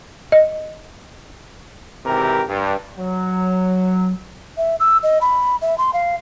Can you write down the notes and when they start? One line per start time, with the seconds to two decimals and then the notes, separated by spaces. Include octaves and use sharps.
0.32 D#5
2.06 G#1 C3 E3 G4 A#4
2.48 G2
2.98 F#3
4.57 E5
4.80 E6
5.03 D#5
5.21 B5
5.62 E5
5.78 C6
5.93 F5